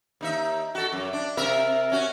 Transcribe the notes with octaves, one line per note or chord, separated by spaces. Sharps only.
D#2 D#4 E5
F#4 A4
F#2
D4
C3 A#4 E5
C#4 F#4